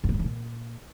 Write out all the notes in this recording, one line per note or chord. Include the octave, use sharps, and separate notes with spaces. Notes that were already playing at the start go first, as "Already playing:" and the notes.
F#2
A#2
A2
E3
A#2